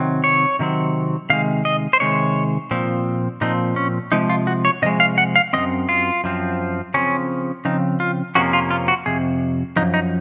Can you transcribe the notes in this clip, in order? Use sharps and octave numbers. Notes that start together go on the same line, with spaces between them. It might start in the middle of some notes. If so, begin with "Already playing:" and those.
Already playing: C3 D#3 F#3 C4
C#5
C3 D#3 F#3 C4
C3 D#3 G#3 F5
D#5
C5
C3 D#3 G#3 C#5
A#2 F3 C4
A#2 F3 C4 D#4
C#4
C3 F3 G#3 D#4
F4
F#4
C#5
C3 F3 G#3 D#5
F5
F#5
F5
F#2 F3 C4 D#5
F4
F#2 F3 C4
C#3 F3 C4 C#4
C#3 F3 C4 D#4
F4
F2 C3 F3 A#3 C#4 F#4
F4
F4
F#4
F2 C3 G#4
F#2 C#3 F3 D#4
D#4